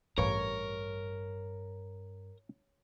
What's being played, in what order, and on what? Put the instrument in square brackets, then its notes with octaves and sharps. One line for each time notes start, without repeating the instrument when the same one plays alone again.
[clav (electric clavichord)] A1 B4 F5 [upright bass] G2 [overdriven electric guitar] A#4 [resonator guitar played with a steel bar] C#5